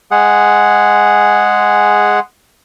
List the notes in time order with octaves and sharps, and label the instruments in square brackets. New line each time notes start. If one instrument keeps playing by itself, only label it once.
[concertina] G#3 G#4 F#5